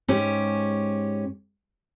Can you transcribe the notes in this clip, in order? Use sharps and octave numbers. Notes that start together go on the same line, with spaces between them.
G#2 C#4 G4